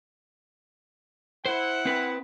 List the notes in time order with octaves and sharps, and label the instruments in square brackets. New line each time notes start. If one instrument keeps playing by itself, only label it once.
[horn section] E4 F#5 [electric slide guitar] C5
[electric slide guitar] C4 B4